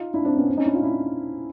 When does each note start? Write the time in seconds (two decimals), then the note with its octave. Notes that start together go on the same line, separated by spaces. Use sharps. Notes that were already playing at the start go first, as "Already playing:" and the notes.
Already playing: D#4 F4
0.14 D4 E4
0.25 C4 D4
0.37 B3 C#4
0.48 C4 D4
0.57 C#4 D#4
0.66 D4 E4
0.74 D#4 F4
0.83 D4 E4